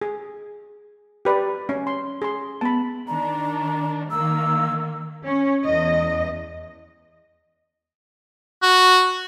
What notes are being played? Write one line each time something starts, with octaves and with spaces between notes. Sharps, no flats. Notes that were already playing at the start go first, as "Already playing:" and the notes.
G#4
G4 B4 D5
C#4
C6
G#4 C6
B3 A5 B5
D#3 D4 A#5
D#3 A#3 E6
C#4
E2 D#5
F#4